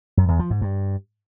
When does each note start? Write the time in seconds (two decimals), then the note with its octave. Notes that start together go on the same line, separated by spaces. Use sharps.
0.17 F#2
0.28 E2
0.39 F3
0.50 G#2
0.61 G2